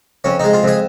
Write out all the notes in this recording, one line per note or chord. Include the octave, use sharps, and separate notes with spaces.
F2 C#4
G#3 D#4
F4
F2 G#4